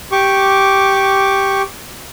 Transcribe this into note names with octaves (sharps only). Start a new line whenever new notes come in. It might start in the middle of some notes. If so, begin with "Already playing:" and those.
G4 C#6 D6